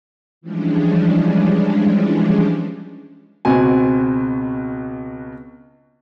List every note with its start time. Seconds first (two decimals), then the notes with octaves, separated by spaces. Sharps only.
0.41 E3 F3 G3 G#3 C#4 D4
3.45 C#2 B2 C4 F#4 G#5